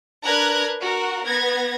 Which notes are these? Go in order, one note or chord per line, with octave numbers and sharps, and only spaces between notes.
D4 A#4 B4 A#5 F#6 G#6
F#4 A#4
B3 G#6 A#6